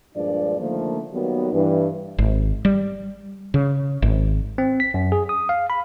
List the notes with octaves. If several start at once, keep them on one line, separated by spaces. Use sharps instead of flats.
G2 A#2 F3 G#3 D4 D5
D3 D#3 F3 A3 A#3
D#3 F#3 G3 A#3 B3
G2 E3
G#1
G3
C#3
G#1
C4
B6
F#2
G#4
D#6
F5
B5